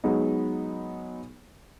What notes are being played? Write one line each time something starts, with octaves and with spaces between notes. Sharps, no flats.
F#3 G#3 B3 D#4